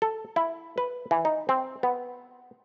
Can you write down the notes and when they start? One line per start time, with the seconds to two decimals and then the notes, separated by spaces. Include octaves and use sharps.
0.02 A4
0.36 E4
0.78 B4
1.11 E3
1.25 D#4
1.49 C4
1.83 B3